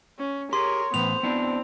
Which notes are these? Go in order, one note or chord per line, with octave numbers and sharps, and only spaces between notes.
C#4
G4 G#4 A#4 C#5 C6
A2 E3 B3 C5 F7
B3 C4 D4 E4